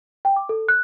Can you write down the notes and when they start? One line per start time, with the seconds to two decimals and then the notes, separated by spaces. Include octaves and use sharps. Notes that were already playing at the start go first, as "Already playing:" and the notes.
0.25 G5
0.36 D6
0.49 A4
0.68 F#6